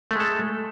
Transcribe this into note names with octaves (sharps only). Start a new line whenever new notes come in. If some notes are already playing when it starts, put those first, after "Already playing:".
G#3 A3 A4